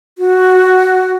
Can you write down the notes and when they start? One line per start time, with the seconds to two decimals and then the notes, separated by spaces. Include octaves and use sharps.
0.18 F#4